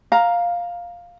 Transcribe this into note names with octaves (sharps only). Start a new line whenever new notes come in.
F5 A#5